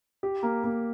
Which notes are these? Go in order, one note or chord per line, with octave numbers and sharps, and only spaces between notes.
G4
A#3
A#3